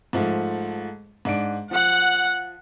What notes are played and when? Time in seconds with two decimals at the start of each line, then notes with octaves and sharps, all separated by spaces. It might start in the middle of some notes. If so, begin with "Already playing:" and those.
0.13 G#2 F3 A3
1.25 G#2 D4 D7
1.71 F3 F#5